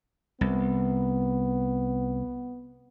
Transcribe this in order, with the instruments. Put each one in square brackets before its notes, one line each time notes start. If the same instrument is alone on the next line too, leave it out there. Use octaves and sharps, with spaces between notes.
[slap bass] C2 [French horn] B3